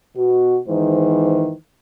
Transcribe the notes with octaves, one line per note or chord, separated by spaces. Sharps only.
B2 F#4
E2 G#2 D#3 E3 C5